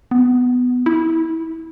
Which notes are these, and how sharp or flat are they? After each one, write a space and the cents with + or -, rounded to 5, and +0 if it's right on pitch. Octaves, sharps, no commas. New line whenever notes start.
B3 +10
E4 -20